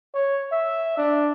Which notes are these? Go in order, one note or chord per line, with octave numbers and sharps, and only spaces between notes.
C#5
E5
D4